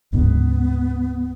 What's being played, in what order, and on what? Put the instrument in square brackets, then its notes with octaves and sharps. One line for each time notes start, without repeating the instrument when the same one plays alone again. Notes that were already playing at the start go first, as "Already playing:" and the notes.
[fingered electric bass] D1 G#2 C#3 [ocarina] B3